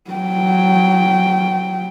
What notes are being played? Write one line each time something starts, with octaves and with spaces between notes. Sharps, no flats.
F#3 G5